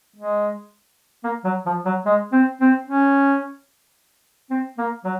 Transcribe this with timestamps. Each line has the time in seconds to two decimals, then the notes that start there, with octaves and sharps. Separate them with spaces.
0.16 G#3
1.24 A#3
1.44 F#3
1.66 F3
1.85 F#3
2.06 G#3
2.33 C4
2.61 C4
2.87 C#4
4.50 C4
4.78 A#3
5.04 F#3